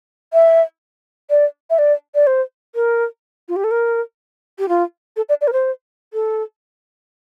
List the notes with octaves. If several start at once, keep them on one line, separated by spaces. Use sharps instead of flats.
E5
D5
E5
D5
D5
C5
A#4
F4
G4
A4
A#4
G4
F4
A4
D5
D5
A#4
C5
A4